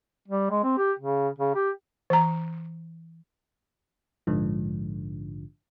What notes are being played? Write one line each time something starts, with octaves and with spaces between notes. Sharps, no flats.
G3
G#3
C4
G4
C#3
C#3
G4
E3 A#5
A#1 G#2 D3 F3